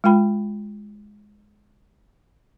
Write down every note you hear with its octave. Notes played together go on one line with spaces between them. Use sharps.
G#3 F4 G5 B5